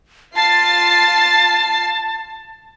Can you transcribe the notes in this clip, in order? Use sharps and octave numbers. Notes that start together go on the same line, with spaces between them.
F4 A5 A6 C7